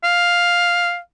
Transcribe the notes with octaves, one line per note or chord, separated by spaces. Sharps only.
F5